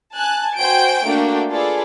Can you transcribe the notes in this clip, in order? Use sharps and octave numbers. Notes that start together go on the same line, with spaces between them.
G#5 A5 F#6
F#4 C5 G5 G#5 G6 D7
A3 A#3 D4 F#4 G5
F4 G#4 A4 B4 D5